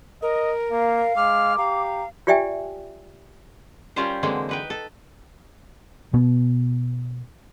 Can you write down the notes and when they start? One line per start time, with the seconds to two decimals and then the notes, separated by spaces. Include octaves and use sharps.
0.22 A#4 D#5
0.72 A#3 F5
1.16 G#3 D6 F6
1.58 G4 F5 A#5
2.27 F4 G4 D5 E5 G5 G#5
3.96 G3 C#4 F4 G4 A#4 C5
4.23 D3 E3 F#3 G#3 A#3 C4
4.49 D#4 B4 G5
4.70 A4
6.14 B2 B3